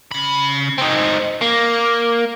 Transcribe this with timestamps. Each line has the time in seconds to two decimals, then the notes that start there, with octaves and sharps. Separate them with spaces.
0.11 C#3 B5
0.78 C4 D#4
1.41 A#3